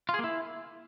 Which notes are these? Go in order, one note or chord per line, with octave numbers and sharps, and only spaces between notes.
F4
G#4
A#3
E4